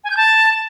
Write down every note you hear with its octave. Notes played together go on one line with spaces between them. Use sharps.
G#5
G6
A5